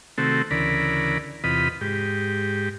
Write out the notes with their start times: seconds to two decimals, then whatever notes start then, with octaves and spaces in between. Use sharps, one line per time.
0.18 C3 D#3 A3 C4 F#4 A4
0.51 D2 C#3 E3 A#4 D5 B5
1.44 E2 C3 F4 B4 D#5 B5
1.81 G#2 G4